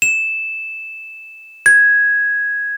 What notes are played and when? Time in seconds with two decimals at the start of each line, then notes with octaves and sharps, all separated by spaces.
0.02 E7
1.66 G#6